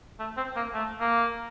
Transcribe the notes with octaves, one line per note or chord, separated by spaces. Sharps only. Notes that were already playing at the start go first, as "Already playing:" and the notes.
A3
C4
A#3
A3
A#3